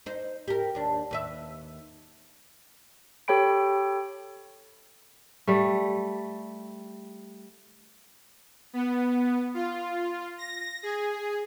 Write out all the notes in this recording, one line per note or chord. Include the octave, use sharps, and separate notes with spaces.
D#4 C5
G4 A#4
D#2 D4
D#2 B4 E5
G4 A4 C#5 G5 B5 D7
G3 A3
B3
F4
A#6
G#4